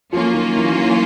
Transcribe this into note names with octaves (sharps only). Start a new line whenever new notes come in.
F3 F#3 A#3 C#4 F4
D#3
E3
D#3
E3